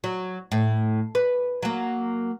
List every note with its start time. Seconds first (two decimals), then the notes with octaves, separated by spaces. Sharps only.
0.04 F#3
0.52 A2
1.15 B4
1.63 F#3 A#3